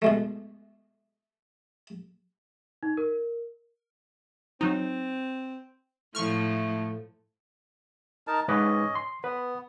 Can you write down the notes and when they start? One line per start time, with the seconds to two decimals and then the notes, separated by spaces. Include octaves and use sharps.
0.02 B2 G#3 A3
2.83 D#4
2.97 A#4
4.61 F#3 C4 D#4
6.15 A2 F3 A3 C#6 F6
8.27 D#4 A#4 A5
8.48 G#2 C#4 B4 D#5 D6
8.95 C6
9.24 B3 B4